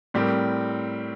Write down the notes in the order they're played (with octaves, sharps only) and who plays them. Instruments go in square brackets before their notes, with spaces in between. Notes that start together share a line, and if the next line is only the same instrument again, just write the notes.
[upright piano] A2 G3 C4 G4 A#4